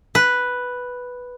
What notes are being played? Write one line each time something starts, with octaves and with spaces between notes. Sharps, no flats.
B4